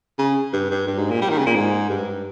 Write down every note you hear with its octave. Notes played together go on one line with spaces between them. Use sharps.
C#3
G2
G2
G2
G#2
A#2
G3
D#3
C#3
A#2
G#2
G2